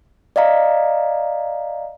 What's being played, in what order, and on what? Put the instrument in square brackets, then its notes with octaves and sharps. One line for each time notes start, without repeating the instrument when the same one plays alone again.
[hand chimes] D5 D#5 F5 A#5